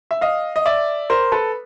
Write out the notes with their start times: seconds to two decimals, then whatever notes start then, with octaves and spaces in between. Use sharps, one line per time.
0.11 E5
0.21 D#5 F5
0.56 D#5
0.66 D5 E5
1.10 A#4 C5
1.32 A4 B4